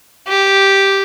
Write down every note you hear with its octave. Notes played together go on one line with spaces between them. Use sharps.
G4